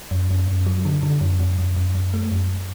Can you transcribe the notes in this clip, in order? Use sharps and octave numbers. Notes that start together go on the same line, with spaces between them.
F#2
F#2
F#2
F#3
D3
D3
F#2
F#2
F#2
F#2
F#2
A3
F#2